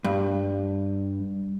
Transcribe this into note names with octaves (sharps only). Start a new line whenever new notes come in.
G2